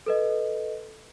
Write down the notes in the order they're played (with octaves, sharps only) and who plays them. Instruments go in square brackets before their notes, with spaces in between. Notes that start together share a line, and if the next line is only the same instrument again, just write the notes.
[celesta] A4 B4 D#5